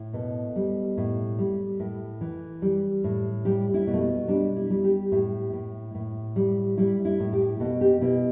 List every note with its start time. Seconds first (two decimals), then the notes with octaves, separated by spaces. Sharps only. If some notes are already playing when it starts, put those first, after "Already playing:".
Already playing: A2
0.13 B2 A4
0.56 G3
0.97 A2
1.39 G3
1.80 A2
2.21 E3
2.62 G3
3.04 A2
3.45 G3 G4
3.74 E4
3.87 B2
3.94 A3
4.01 B3
4.28 G3 D4
4.56 E4
4.70 G3
4.84 G4
5.12 A2 G4
5.53 A2
5.95 A2
6.36 G3
6.77 G3 E4
7.05 E4
7.20 A2
7.33 G4
7.60 B2 A4
7.81 G4
8.01 B2 E4